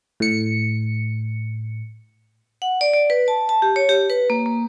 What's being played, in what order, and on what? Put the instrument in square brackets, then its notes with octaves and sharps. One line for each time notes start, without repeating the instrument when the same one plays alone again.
[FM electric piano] A2 C#7
[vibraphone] F#5
D5
D5
B4
A5
A5
G4
C#5
G4
B4
A#3
A#3